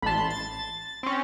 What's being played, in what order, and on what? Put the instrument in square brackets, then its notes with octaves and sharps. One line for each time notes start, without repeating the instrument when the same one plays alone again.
[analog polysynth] A1 C6 [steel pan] A5 B5
[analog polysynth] A6
C4 C#4